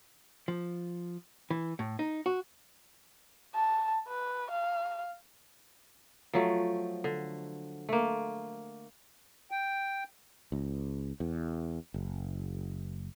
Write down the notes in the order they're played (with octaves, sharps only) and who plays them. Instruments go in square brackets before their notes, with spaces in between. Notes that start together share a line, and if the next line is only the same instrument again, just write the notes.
[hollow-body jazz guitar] F3
E3
A2
D#4
F#4
[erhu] A5
B4
F5
[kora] F3 F#3 A3
D3
A3 A#3
[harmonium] G5
[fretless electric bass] C#2
E2
F#1